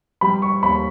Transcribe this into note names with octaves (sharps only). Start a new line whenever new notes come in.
G3 B5
C#6
D#2 B5